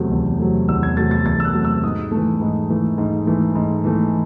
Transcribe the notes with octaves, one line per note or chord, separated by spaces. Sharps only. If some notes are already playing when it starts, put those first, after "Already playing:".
Already playing: E2 C3 F#3 A3
E2
C3 F#3 A3
E2 E6
G#6
C3 F#3 A3 A6
A6
E2 A6
E6
F#6
C3 F#3 A3
E6
G#2 D#6
E3 A3
G#2
E3 A3
G#2
E3 A3
G#2
E3 A3